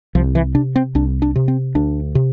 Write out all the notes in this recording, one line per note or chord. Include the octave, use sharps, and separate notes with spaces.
C2 F3
E3
C3 D4
C4
C2 D4
D4
C3
C4
D2 D4
C3